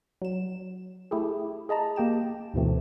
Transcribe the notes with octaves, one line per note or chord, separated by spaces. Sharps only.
F#3 E7
A3 E4 G4 G#4
G#4 D#5 A5 A#5
A#3 G4 G5 E7
D2 G#2 B2 E3 A3 C4